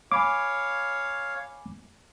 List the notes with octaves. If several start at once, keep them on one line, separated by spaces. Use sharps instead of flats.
C#5 F5 G#5 B5 D6